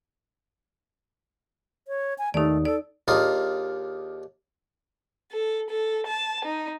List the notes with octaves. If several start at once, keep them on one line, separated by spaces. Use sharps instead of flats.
C#5
G#5
D#2 A3 D#4 D5
A4 D5
D#2 D4 D#4 F4 G#4 D#6
A4
A4
A5
D#4